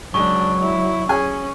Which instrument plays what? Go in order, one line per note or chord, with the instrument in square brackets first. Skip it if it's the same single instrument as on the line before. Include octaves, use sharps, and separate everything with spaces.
[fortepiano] C#2 [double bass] F#3 [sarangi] D4 [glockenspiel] C#6
[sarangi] E4
[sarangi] C#4 [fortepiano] G#4 G#5